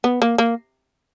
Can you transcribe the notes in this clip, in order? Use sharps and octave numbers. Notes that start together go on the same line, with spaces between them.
B3
A#3
A#3